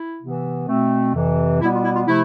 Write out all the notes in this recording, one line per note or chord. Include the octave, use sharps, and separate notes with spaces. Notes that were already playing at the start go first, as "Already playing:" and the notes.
Already playing: E4
C3 E3 B3
B2 A3 C4
F2 C3 E3
B2 G3 B3 E4
F4
E4
F4
C3 F3 A3 E4